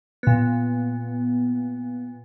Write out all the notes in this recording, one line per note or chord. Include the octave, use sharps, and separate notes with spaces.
A#2 B3